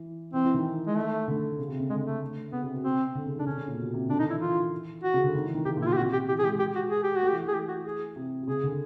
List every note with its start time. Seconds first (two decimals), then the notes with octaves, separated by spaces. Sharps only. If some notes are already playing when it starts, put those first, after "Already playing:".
Already playing: E3
0.33 E3 C4
0.44 E3
0.54 D#3
0.87 G#3
0.97 A3
1.28 D3
1.59 C#3
1.69 C3
1.80 C#3
1.90 D3 G#3
2.05 A3
2.52 C#3 B3
2.63 C3
2.74 B2
2.84 C3 C4
3.15 D3
3.26 C#3
3.36 D#3 D4
3.46 D3 C#4
3.57 C#3
3.68 A#2
3.78 B2
3.94 C3
4.09 D3 D4
4.19 D#3 D#4
4.30 E3 E4
4.41 F4
5.03 F#4
5.14 C#3
5.24 D3
5.35 D#3
5.44 E3
5.55 D#3
5.65 C#3 G4
5.76 A#2
5.82 E4
5.86 B2 F4
5.93 G4
5.97 C3 F#4
6.13 G4
6.28 E3 G4
6.39 G#4
6.44 G#3 G4
6.59 G4
6.76 F#4
6.90 G#4
7.03 G4
7.16 F#4
7.22 A3
7.29 G4
7.33 E3
7.43 E3 G#4
7.53 G4
7.69 F#4
7.85 G#4
8.16 C3
8.42 C3
8.47 C#3 G#4
8.63 D3